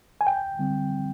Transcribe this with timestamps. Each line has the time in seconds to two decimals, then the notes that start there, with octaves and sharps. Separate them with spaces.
0.21 G#5
0.27 D2 G5
0.59 D3 G3 C4